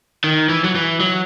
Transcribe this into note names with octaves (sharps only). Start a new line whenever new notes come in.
D#3
E3
F#3
E3
F#3